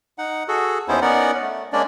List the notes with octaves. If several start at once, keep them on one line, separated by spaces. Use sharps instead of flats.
D#4 F#5
F#4 G#4 A4
D#2 B3 C#4 D#4 E4 C5
B3 C#4 D#4 A#4 D5 F#5
A3
G#3 A#3 C#4 D4 D5